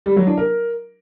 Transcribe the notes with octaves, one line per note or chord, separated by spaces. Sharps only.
G3
F#3
D4
A#4